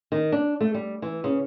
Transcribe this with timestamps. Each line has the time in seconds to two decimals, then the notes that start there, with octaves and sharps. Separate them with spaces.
0.12 D#3
0.32 D4
0.61 A3
0.74 G3
1.02 E3
1.24 C#3